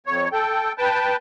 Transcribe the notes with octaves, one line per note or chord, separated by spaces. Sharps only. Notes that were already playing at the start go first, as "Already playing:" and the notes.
F2 C#5
A4 G5
B4 G5 A5